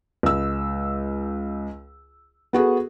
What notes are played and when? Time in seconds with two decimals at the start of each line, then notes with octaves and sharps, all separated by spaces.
0.23 C#2 E6
2.53 B3 F#4 G#4 A4